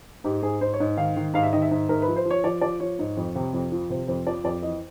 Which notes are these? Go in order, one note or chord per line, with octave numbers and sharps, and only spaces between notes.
G#2 G4
G#2 G#4
G#2 C5
C#5
G#2
D#3 F5
D#3
G#2 F5
E5
D#3 D#5
E5
G#2
G#2 A#4
B4
F3
C5
F3
C#5
F3 D5
F3 D5
F3 C#5
G#2
F2
C3
F2
F3
C3 C5
F2 C5
F3 D5
F2 D5
E3 D#5